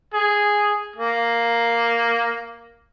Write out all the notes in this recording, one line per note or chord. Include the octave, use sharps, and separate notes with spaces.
G#4
A#3